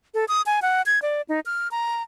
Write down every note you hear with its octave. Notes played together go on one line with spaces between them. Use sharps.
A4
D#6
G#5
F#5
G#6
D5
D#4
F6
A#5